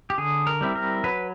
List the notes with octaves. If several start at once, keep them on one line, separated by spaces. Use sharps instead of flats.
G4
D3 G#4
A#4
G3 C4 E4
A#4
F#3 B4